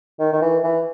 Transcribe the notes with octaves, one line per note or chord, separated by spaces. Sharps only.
D#3
D#3
E3
E3